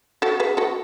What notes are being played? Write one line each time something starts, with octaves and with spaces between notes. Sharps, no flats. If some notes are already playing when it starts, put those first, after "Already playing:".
F#4 A4
G#4 B4
F#4 A4